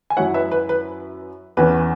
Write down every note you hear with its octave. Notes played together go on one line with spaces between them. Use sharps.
G#5
F#2 F#3 E4 C#5 F#5
B4 E5
B4
B4
E2 E3 C#4 B4